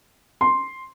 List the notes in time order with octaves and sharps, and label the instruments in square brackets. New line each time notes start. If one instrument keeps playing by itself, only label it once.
[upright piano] C6